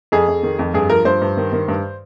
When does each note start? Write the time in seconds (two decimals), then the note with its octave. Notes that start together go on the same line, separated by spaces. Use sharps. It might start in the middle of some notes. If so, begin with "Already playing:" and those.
0.12 F2 G#4
0.28 F2
0.43 D#3
0.59 F2
0.74 G2 G#4
0.90 F3 A#4
1.05 G2 C5
1.22 G2
1.37 D#3
1.53 D#3
1.68 G2